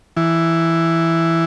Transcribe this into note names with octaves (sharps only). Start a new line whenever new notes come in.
E3